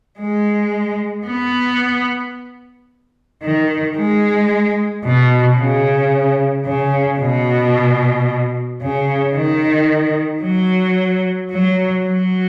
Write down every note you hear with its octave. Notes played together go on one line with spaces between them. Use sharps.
G#3
B3
D#3
G#3
B2
C#3
C#3
B2
C#3
D#3
F#3
F#3
F#3